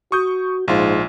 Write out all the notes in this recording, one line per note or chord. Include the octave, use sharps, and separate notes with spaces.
F#4 C#6 D#6 G6
A#1 G#2 F4